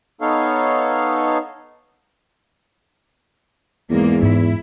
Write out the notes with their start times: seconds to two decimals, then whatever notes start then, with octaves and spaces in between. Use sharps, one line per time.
0.21 B3 D#4 A4 C#5 F5
3.90 E2 G#2 G#3 A#3
4.23 G#2 E4